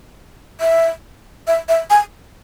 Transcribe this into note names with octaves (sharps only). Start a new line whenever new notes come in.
E5
E5
E5
G#5